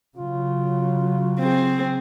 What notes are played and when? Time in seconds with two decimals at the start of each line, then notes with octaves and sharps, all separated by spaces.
0.17 C#3 F#3 F4
1.40 C4 G#4